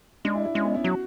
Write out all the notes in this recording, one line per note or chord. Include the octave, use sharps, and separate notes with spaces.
G#3 D4
E4
E4
G#3 C#4
B3
E4
F#3 F#4